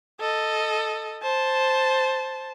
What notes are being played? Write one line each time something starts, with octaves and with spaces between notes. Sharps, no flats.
A4 D#5
C5 A5